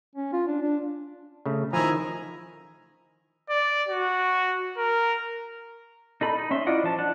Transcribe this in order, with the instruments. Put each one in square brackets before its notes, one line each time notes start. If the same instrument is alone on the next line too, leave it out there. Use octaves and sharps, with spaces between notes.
[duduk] C#4
F4
D4
D4
[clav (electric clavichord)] C#3 A3
[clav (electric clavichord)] D#3 F3 [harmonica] E4 G#5 A#5
[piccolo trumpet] D5
F#4
A#4
[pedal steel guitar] D#4 A4 B5
D#4
C#4 E5 C6
E4 F4 D5 D#5 F#5
F3 A5
D4 F#5 A5